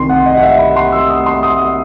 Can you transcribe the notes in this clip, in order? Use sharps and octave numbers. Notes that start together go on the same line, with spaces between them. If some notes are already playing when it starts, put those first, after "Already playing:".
Already playing: C2 C3 D#3 C6
F#5
D#5
F#5
E5
B5
C6
E6
D#6
C6
D#6